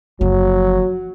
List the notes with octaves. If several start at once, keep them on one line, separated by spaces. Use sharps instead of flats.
F#1 F3 F#3